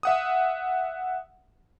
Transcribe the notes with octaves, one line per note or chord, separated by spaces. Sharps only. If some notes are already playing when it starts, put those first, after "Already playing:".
E5 F#5 D#6